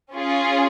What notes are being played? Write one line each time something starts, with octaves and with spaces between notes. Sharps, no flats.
C#4 F4 G#4